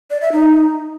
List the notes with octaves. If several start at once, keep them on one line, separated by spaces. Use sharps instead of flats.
D5
E5
D#4